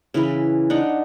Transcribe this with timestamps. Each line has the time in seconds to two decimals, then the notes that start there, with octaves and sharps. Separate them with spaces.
0.14 C#3 E3 E4 B4
0.70 D4 D#4 F#5